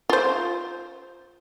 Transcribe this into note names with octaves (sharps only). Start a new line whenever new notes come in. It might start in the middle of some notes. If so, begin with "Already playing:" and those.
F4 C5